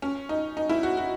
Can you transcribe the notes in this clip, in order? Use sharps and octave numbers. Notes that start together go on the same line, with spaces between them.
C#4
D#4
D#4
E4
F#4
F#4